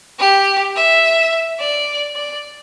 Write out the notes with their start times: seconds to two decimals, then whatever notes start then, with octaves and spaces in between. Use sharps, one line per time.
0.19 G4
0.76 E5
1.59 D5
2.15 D5